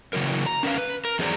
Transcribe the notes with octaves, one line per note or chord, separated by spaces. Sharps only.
C#3 E3 F#3 A#4
A#5
C#4 A#4 B4 F5
B4
A#4
E2 F#3 G#4 C5 D5 A#5